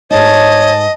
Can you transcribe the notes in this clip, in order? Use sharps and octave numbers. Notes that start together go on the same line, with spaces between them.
G#2 A3 D#4 C#5 D#5 A5